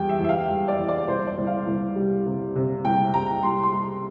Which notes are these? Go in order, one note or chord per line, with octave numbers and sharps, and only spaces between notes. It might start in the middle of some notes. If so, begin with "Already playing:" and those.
Already playing: E2 G3 G5
E5
E2 E5
F5
G3
D5
E2
D5
C2 C5
D5
C2
F5
C2
G3
C3
C3
C2 G5
C3 A#5
G3 C6
C6
G3
C6